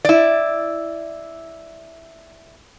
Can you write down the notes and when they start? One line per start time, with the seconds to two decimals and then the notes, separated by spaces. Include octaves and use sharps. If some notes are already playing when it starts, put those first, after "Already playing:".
0.05 E4 D5